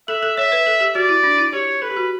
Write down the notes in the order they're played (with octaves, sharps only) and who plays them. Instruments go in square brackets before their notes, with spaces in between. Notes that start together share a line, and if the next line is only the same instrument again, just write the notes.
[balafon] A4 [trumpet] E5
[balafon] A4
[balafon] C#5 [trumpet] E5
[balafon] B4
A4
G4
[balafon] F#4 [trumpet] D5
[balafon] E4
D4
E4
[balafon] G4 [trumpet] C#5
[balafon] A4 [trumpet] B4
[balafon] G4
F#4